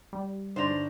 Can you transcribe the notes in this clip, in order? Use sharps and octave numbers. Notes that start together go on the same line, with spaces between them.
G3
G1 D4 D#4 C5 A#6 F7